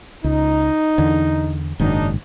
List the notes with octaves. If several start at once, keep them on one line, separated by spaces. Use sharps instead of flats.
C#2 D#4
E2 D3
F#1 G#2 D#3 F#3 D4 D#4